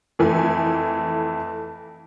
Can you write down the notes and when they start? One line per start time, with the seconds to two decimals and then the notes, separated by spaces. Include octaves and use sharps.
0.19 F2 E3 A3 G#5